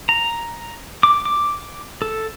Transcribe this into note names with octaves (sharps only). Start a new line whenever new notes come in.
A#5
D6
D6
A4